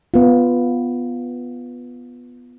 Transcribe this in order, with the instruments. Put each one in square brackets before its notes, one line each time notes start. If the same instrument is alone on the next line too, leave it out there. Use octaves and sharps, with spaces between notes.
[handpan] B3 F4